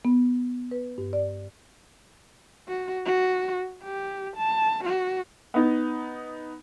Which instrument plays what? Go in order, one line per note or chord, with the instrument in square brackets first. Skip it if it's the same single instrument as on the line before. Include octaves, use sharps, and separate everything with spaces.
[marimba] B3
B4
G2
D5
[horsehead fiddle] F#4
F#4
G4
A5
F#4
[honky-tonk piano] B3 D#4